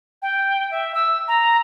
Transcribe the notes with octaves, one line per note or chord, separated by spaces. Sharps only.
G5
E5
E6
A#5